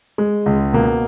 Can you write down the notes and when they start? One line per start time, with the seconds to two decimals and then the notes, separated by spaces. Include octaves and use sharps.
0.18 G#3
0.46 C#2
0.73 B2 A#3